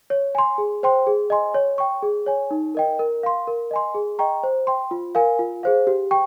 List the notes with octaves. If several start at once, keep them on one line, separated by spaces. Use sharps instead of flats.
C#5
G#5 C6
G#4
C5 G5 C6
G#4
D#5 G#5 C6
C#5
G5 C#6
G#4
C#5 G#5
D#4
A#4 D#5 G5
A#4
F5 C6
A#4
D#5 G#5 C6
G#4
D#5 G5 A#5 C#6
C5
G5 C6
F4
A#4 F5 G#5
F4
G#4 C5 F5
G4
G5 C#6